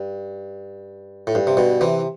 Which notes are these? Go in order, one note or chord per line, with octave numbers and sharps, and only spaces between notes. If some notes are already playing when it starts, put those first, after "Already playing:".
Already playing: G2
A2
G2
C3
G2 B2
C3 E3